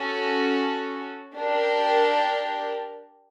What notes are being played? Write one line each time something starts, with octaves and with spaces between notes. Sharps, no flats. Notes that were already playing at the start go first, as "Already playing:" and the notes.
Already playing: C#4 F#4 A4
D4 G4 A#4